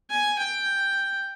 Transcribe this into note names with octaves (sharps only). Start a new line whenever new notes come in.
G#5
G5